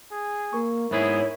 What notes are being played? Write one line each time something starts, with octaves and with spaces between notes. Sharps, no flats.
G#4
A#3 A#4 C#6
G#2 B3 E4 G#4 C#5